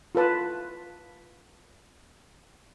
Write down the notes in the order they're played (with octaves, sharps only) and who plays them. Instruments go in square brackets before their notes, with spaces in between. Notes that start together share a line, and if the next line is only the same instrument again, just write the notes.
[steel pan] F4 A4 B4 A5